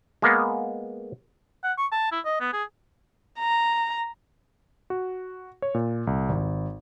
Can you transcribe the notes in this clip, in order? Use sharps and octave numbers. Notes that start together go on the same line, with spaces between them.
G#3 A#3 B3
F#5
C#6
A5
E4
D#5
B3
G#4
A#5
F#4
C#5
A#2
C2
G#1